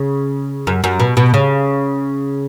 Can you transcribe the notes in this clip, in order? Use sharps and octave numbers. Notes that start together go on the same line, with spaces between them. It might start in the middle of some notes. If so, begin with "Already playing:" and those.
Already playing: C#3
F#2
F#2
B2
B2
C#3